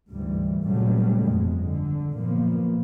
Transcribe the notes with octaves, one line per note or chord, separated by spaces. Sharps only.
D2 G#2 E3 G3
A#2 C#3 F#3 G3 A3
G1 F2 B2 G#3
D3
F#2 A#2 F3 A#3 B3